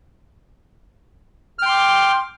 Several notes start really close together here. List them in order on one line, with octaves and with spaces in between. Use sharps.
F6 G5 C6 D6